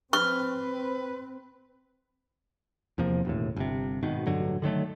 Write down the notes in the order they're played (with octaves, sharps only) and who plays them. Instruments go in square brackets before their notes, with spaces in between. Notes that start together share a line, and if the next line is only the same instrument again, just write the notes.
[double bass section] C4 [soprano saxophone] B4 [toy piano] C#6 [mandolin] F6
[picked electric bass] E2 C3 F3 A#3
E1 D#2 A2
G1 C3
G#1 B2 D#3
A1 G2 D3 F#3
D3 D#3 F#3 A3